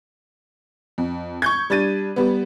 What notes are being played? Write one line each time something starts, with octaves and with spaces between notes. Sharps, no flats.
F2
C#6 G6 G#6
G3 D4 A6 D#7
G3 B3